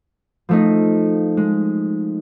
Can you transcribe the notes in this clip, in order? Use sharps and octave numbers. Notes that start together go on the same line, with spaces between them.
F3 A3 D#4
G#3